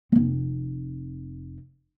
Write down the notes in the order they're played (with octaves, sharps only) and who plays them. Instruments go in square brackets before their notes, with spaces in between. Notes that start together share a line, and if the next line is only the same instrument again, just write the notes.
[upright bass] F1 C4